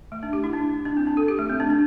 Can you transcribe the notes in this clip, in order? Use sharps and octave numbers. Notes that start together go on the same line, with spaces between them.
A3
D4
G4
E4
D4
D4
C4
D4
A4
G4
A3
C4
D4
D4